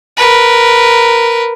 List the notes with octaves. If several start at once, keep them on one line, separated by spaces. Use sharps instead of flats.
A#4 B4